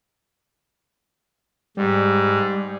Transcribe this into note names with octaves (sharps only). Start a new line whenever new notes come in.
G#2 G3